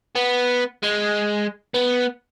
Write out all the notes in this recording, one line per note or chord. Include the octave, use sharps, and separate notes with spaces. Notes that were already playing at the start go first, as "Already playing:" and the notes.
B3
G#3
B3